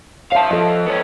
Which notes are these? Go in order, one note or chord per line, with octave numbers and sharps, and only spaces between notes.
C#5 E5 F5 A5
F2 F3 A4 D#5
B3 C#4